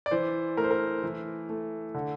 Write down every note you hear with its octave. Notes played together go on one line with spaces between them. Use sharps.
D5
E3 C5
A3 A#4
C5
A#4
E3
A3
D3